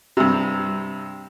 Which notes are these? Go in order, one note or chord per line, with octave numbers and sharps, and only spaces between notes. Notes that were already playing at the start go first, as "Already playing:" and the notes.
G2 C3